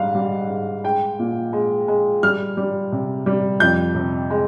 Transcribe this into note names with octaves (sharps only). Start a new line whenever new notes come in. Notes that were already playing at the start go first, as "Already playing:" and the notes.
Already playing: G#2 G3 F5
G3
G#2
G#3 G5
A#2
G#3
G#3
G3 F6
G3
C3
G3
F2 G6
C3
G#3